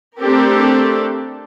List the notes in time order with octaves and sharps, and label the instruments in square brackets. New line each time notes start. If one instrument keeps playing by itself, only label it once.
[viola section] A3 C4 D4 G4 A4 A#4